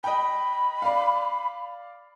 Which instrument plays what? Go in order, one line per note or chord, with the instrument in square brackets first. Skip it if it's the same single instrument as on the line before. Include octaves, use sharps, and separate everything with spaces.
[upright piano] D#5 G5 [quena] B5
[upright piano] D5 F5